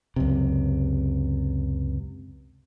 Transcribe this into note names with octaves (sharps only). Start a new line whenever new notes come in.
C#2 F#2 C3